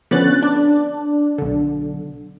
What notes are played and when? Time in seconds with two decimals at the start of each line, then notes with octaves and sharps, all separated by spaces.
0.11 D3 F3 B3 C#4 F#6 A6
0.42 D4
1.38 B1 D3